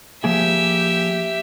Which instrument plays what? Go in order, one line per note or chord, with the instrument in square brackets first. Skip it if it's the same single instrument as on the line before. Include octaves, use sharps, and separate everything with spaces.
[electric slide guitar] F3 A#3 G#4 [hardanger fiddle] G4 E5